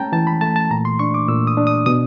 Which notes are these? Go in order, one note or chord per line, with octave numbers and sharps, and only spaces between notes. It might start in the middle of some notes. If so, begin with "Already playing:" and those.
Already playing: A3 C#4 G5 A5 A#5
E3 A5
B5
A3 A5
A5
A#2 A#5
C6
D4 C#6
D6
A#2 E6
D#6
D4
D#6
B2 D#6